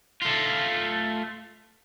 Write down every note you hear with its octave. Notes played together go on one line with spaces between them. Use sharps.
A3 F4